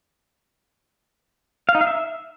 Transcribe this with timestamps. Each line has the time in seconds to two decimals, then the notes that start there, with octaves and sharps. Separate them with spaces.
1.69 F5
1.75 D#4
1.81 F5
1.87 E5